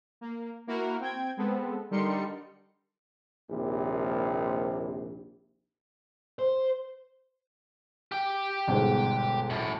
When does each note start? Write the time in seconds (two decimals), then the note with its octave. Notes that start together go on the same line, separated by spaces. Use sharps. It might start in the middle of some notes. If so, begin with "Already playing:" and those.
0.21 A#3
0.67 A#3 E4 F#4 A#4
1.00 C4 G5 G#6
1.37 G#3 B3 C4 A4
1.90 D3 G3 D#4 A#4 C6 C#7
3.50 A#1 D#2 C3
6.39 C5
8.12 G4 G5
8.68 G1 G#2 B2
9.50 F#2 A2